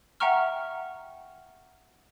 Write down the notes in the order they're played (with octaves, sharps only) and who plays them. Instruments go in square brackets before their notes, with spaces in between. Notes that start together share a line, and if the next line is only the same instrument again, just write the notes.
[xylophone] E5 F#5 G5 A#5 C#6 F6